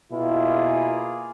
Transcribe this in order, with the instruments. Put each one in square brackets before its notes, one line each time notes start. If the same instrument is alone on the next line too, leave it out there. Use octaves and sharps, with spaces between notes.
[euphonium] B2 [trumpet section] A#3 F4 G#4 [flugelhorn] E4